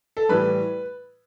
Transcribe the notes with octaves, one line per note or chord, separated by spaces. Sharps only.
A4
A2 E3 G3 B4